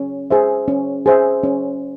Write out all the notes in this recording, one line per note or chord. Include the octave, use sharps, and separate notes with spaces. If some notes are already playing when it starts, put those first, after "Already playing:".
Already playing: C#4
G#4 C5 E5
C#4
G#4 C5 E5
C#4